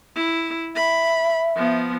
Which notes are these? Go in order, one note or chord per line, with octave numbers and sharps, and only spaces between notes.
E4
E5 B5
F3 B3